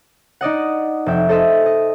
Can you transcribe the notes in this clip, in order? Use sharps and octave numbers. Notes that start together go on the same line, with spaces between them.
D#4 D5 D#5 F#5
F1 E5 G5
A4 C5 D#5 E5
D#5